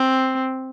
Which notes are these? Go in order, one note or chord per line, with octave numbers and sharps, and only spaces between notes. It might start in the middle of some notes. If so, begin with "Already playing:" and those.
Already playing: C4